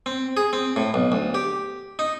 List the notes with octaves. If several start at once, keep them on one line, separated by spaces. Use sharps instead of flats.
C4
G#4
C4
A2
B1
D2
G4
D#4